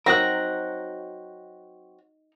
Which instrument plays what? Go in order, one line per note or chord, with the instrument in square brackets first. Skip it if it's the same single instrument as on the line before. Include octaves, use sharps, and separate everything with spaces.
[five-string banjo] F#3 C4 [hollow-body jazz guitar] D#4 F#4 A#4 [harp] F#6 A#6